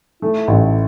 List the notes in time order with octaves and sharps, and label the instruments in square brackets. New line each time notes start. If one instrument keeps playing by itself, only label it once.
[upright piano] A3 [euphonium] E4
[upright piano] A1